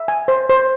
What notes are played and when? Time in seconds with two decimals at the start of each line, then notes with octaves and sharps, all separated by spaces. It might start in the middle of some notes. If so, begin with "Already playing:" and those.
Already playing: E5
0.08 G#5
0.28 C5
0.49 C5